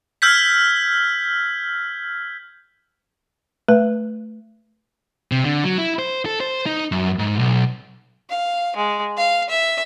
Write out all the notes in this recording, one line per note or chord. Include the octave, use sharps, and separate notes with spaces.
E6 F6 G6 G#6 B6
A3 B4
C3
D3
F#3
E4
C5
A4
C5
D#4
F#2
G#2
B1
F5
G#3
F5
E5